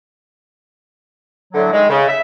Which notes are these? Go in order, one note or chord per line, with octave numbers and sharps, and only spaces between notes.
A2 D3 F#3
D#3 G#3
C#3
E5